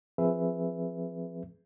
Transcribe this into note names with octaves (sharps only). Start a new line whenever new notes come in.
F3 C4 G#4 B4 E5